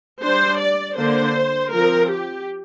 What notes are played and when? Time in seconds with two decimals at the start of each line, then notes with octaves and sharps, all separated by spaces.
0.22 G3 D4 C5
0.60 D5
0.98 D3 A#3 D4 C5
1.72 F3 C4 A#4
2.10 G4